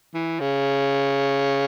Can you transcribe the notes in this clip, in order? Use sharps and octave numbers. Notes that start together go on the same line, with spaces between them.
E3
C#3